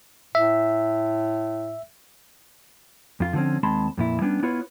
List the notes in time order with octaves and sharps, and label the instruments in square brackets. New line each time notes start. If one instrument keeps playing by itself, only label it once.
[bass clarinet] A2 [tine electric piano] E5
[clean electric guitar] F2 F4
D3 F3 A#3 C4 C#4
D#2 G#3 C4 A5 B5 C6
F2 A#2 E4
G3 B3 C#4 D4
B3 E4 F4 B4 C#5